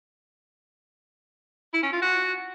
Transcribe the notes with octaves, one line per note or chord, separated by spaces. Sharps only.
E4
C#4
F4
F#4